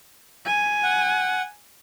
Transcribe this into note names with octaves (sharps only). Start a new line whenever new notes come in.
G#5
F#5